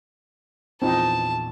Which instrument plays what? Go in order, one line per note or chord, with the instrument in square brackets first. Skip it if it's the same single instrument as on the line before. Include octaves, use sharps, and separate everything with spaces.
[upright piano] A#1 E2 A#2 [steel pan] C4 D#4 [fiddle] A5